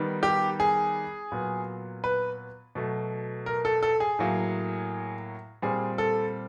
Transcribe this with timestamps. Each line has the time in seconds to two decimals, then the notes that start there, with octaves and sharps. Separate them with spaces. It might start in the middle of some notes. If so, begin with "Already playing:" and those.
Already playing: D#3 G3 B3
0.23 G4
0.60 G#4
1.32 A#2 F#3 B3
2.04 B4
2.75 B2 F#3 A3
3.46 A#4
3.65 A4
3.83 A4
4.00 G#4
4.19 A2 F#3 A#3
5.62 A#2 G3 C4 G#4
5.98 A4